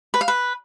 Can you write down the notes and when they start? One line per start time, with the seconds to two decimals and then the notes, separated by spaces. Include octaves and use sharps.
0.14 B4
0.21 F5
0.28 B4